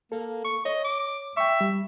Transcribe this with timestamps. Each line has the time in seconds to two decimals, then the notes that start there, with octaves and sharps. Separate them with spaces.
0.12 A#3 A4
0.44 C#6
0.65 C#5 D#5
0.84 D6
1.37 E5 G5 C#6
1.61 G3